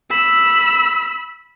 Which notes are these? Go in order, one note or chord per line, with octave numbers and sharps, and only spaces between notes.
B5 E6